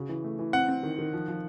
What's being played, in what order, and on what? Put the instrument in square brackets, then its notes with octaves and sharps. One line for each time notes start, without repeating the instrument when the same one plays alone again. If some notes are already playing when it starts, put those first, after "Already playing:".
Already playing: [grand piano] C#3 F#4
E3
A3
E3
[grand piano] C4 [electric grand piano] F#5
[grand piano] C4
D#3
D#3
F3
F3